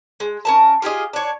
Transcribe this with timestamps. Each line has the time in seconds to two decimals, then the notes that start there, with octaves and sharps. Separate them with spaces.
0.20 G#3
0.45 C#4 A#4 A5
0.82 F4 G4 G#4 D#5
1.13 D4 C#5